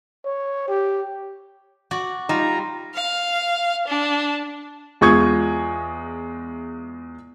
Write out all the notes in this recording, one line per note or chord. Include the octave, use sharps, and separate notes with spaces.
C#5
G4
F#4 D5
G3 D#4 F4 A#5
F5
D4
E2 G#3 F4 C#6 D#6 G#6